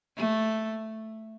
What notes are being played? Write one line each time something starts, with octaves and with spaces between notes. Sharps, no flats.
A3